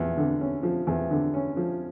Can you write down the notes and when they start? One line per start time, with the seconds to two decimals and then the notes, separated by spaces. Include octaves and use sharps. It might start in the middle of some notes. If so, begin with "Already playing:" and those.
Already playing: E2 F3
0.17 D3
0.40 C#4
0.63 F3
0.87 E2
1.11 D3
1.34 C#4
1.57 F3